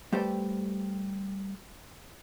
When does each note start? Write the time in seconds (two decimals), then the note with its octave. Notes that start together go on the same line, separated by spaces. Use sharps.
0.12 G3 A3 G4 B4 C5 D5